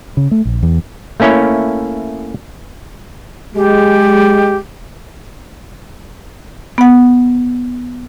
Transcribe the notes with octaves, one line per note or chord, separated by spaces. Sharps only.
C#3
A3
A#1
E2
A3 A#3 C#4 E4 C#5
G#3 G4
B3 F#5